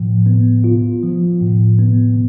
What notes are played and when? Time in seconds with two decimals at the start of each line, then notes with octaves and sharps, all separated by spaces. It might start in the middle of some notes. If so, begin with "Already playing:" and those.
Already playing: A2 F3
0.26 B3
0.64 F4
1.03 F3
1.40 A2
1.79 B3